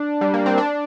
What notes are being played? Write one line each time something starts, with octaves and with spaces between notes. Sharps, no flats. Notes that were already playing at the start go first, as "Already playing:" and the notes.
Already playing: D4
G3
A#3
C4
D4